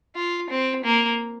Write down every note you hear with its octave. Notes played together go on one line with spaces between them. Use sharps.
F4
C4
A#3